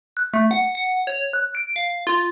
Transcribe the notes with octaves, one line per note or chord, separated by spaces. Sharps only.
F#6
A3
F#5
F#5
C#5
F#6
D7
F5
F4